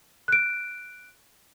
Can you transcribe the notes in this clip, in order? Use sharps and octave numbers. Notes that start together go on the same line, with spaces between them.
F#6 D7